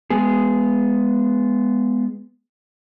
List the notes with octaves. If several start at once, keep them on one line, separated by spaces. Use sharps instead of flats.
G#3 B3 G#4